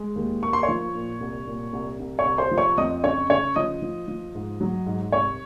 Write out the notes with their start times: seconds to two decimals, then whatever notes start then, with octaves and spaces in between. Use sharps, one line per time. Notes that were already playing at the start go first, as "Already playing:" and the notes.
Already playing: G#3
0.16 D#2
0.42 A#3 C#6
0.53 C6
0.63 C#5 C#6
0.69 F3
0.95 A#2
1.21 C2
1.47 A#2
1.73 C2
1.99 C2
2.19 C#5 C#6
2.25 C2
2.38 C5 C6
2.51 F3
2.58 C#5 C#6
2.78 F2 D#5 D#6
3.04 C#3 C#5 C#6
3.30 C#3 C#5 C#6
3.56 F3 D#5 D#6
3.82 F3
4.08 F3
4.35 G#2
4.61 F#3
4.86 G#2
5.12 C2 C#5 C#6